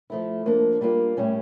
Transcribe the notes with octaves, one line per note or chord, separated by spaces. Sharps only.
F3 A3 E4
F3 A#3 D4
G3 A#3 D4 F4
A2 G3 C#4